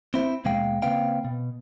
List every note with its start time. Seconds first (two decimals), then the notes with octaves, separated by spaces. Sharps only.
0.14 C4 E4 C5
0.45 D#2 B2 G#3 F5 G5
0.82 C#3 A#3 C4 B4 F5 G5
1.25 B2